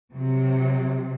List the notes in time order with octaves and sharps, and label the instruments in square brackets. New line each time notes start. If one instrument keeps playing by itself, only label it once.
[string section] C3 F#3